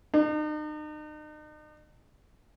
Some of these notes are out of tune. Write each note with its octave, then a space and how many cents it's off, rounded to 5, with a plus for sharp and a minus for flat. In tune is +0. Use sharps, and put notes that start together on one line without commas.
D#4 -40